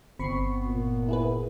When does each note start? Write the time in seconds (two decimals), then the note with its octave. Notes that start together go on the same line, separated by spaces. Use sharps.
0.20 G1 B3 C4 B5 C#6 C7
0.65 A#2
1.09 E4 G#4 B4